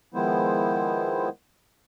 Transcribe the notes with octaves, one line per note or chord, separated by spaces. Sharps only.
D#3 F3 G#3 B3 E4 C5